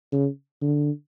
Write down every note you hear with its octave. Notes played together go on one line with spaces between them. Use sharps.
C#3
D3